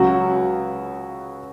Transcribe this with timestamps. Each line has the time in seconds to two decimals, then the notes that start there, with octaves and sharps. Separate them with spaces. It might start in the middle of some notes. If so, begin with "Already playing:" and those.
Already playing: C#2 C#3 F#3 F#4